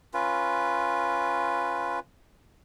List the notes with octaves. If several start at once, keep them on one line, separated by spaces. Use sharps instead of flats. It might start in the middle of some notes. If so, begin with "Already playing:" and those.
C#4 F4 B4